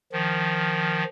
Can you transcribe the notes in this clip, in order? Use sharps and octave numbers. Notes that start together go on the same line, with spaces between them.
D#3 F3